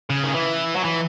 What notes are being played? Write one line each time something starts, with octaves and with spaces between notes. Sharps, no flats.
C#3
D#3
E3
F#3
E3